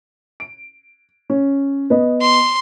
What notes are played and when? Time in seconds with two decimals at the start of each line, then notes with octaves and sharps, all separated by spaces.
0.40 D7
1.30 C#4
1.90 B3 D#5
2.21 C6